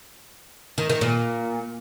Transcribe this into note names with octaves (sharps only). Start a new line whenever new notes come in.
D#3
D#3
A#2